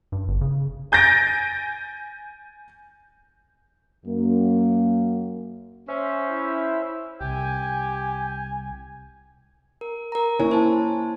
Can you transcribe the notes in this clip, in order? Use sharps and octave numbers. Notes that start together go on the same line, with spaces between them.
G2
G1
C#3
G#5 G6 A6 A#6 D7
F#2 A#3
C#4 C5 E5
E4
C2 G4 G#5
A#4
A#4 A#5
A#3 E4 C#5 G#5
C5 A5